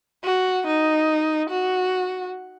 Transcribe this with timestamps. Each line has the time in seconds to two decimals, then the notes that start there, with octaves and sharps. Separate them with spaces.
0.24 F#4
0.67 D#4
1.50 F#4